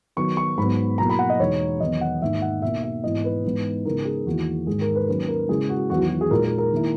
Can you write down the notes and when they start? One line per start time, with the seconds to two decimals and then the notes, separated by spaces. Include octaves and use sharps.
0.17 D#3 F#3 B3 D#4 C#6
0.37 C#6
0.58 G#2 F#3 B3 B5
0.98 B2 F#3 A#3 E4 A#5
1.10 B5
1.19 F#5
1.30 D#5
1.39 E2 B2 G#3 D#4 C#5
1.80 E2 D#3 F#3 B3 D#5
2.01 F#5
2.22 G#2 D#3 A#3 D#4 E5
2.42 F#5
2.62 B2 A#3 D#4 E5
2.83 E5
3.04 G#2 E3 B3 E4 D#5
3.24 B4
3.44 G#2 E3 B3 D#4
3.85 C#3 G#3 B3 D#4 A#4
4.05 G#4
4.26 E2 D#3 A#3 E4 F#4
4.67 G#2 D#3 G#3 G#4
4.81 A#4
4.95 B4
5.08 D#3 F#3 A#3 C#4 B4
5.28 A#4
5.49 C#3 G#3 C#4 E4 G#4
5.69 F#4
5.90 E2 D#3 F#3 B3 E4 F#4
6.01 F#4
6.11 F#4
6.21 G#4
6.31 A#2 G#3 D#4 A#4
6.44 A#4
6.58 A#4
6.72 D#3 A#3 E4